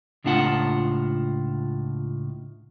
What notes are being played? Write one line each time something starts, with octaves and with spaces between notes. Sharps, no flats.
C#2 A2 D4 F4 F#5 A5